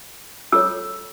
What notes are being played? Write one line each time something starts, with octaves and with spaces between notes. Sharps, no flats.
F4 A4 C#5 D6 E6